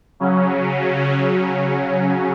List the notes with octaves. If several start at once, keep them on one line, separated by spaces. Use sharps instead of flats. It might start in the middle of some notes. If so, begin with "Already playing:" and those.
C#3 F#3 C#4